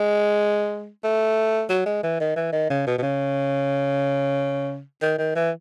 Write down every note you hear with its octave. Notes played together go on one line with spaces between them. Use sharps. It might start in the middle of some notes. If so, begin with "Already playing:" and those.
Already playing: G#3
A3
F#3
G#3
E3
D#3
E3
D#3
C#3
B2
B2
C#3
D#3
D#3
E3